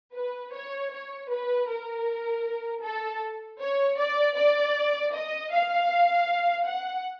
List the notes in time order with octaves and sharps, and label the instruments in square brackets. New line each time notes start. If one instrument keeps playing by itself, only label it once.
[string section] B4
C#5
C#5
B4
A#4
A4
C#5
D5
D5
D#5
F5
F#5